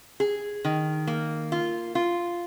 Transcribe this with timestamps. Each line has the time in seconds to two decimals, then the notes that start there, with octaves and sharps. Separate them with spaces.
0.20 G#4
0.65 D#3
1.07 A#3
1.52 F4
1.95 F4